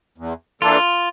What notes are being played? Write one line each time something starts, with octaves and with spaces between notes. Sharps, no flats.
E2
E3 A#3 D4 F4 A4